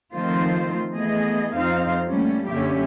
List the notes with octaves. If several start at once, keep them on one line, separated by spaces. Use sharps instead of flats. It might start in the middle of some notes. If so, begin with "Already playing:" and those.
D#3 F3 A3 C4 F4 C5
E3 A3 B3 G#4 D#5
F2 C4 D#4 F4 C5 F5
G3 A3 A#3 C#4
F#2 D3 A#3 C#4 G4 E5